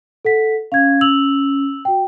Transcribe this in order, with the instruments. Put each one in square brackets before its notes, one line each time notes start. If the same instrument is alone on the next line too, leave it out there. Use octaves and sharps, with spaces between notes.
[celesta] A4 F#5 B6
[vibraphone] C#4 [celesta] F5 G#6
[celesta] E6 F7 F#7
F#4 G5